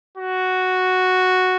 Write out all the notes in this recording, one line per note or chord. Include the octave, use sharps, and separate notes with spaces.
F#4